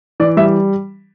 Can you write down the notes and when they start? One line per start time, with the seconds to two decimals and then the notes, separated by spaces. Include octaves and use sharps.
0.20 E3 D5
0.37 G3 E5